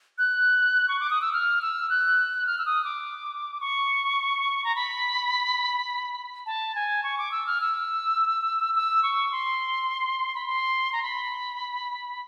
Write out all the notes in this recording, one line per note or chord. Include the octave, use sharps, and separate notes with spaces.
F#6
C#6
D6
D#6
E6
F6
E6
F#6
F6
E6
D#6
D6
C#6
A#5
B5
A5
G#5
C#6
D6
E6
F6
E6
E6
C#6
C6
B5
C6
A#5
B5